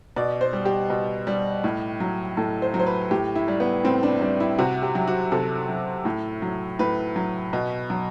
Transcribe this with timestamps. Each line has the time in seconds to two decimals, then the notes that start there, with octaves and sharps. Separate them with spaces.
0.16 B2 D5
0.41 C5
0.53 G3
0.65 G4
0.90 B2
1.27 G3
1.64 A2
2.00 F#3
2.37 A2 A4
2.62 C5
2.74 F#3
2.79 C5
2.86 B4
3.11 A2 G4
3.35 E4
3.48 G3
3.60 B3
3.84 A2 C4
4.03 D4
4.21 G3 D4
4.40 E4
4.58 C3 F#4
4.82 G4
4.95 F#3
5.07 F#4
5.32 C3 A4
5.69 F#3
6.05 A2
6.42 F#3
6.79 A2 B4
7.16 F#3
7.53 B2
7.90 F#3